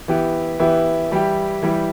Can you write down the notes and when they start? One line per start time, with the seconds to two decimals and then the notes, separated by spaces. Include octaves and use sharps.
0.08 E3 B3 E4 G4
0.60 E3 B3 E4 G4
1.11 E3 G3 E4 G4
1.63 E3 G3 E4 G4